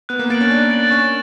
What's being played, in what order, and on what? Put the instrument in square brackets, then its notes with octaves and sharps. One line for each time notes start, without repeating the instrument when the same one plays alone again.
[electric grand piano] B3 [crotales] F#6
[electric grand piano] A#3
[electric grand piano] A#3 [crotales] A6 D7 F#7
[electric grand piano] C#4
[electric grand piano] D4 [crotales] F#6
[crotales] A6 D7 F#7
[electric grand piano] C#4 [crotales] C#6